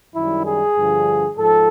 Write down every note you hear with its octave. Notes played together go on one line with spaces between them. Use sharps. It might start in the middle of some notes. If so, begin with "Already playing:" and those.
F#2 D#3 G3 E4
G#4
G2 D3 F3
G#2 F3 A4